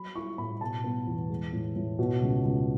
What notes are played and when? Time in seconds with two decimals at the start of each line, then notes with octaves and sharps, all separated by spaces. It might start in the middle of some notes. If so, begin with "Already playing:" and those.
Already playing: F#3 B5
0.15 E4 C#6
0.38 A2 B5
0.61 B2 A5
0.84 B3
1.07 E2
1.30 G#3
1.53 A2
1.76 A2
1.99 B2
2.21 C#2
2.44 C#2